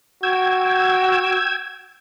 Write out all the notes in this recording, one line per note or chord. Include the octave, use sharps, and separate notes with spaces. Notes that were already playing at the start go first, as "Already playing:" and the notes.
F#4 G5 E6 G#6